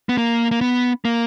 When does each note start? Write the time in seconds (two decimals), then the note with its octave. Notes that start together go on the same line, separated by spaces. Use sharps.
0.09 B3
0.18 A#3
0.51 A#3
0.61 B3
1.05 A#3